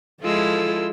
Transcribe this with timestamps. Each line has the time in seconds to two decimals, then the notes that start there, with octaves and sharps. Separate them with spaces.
0.22 F3 G#3 E4 F4 A4 E6